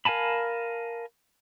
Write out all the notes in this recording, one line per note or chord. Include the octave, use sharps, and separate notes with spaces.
A#4 F5 G#5 A5 B5